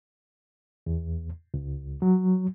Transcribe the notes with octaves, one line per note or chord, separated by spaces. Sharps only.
E2
C#2
F#3